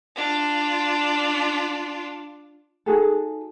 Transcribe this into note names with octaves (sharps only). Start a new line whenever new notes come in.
D4 F4
D#4 F#4 G#4 A4